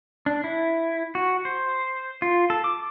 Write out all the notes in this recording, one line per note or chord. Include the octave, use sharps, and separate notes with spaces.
D4
E4
F#4
C5
F4
A4
D6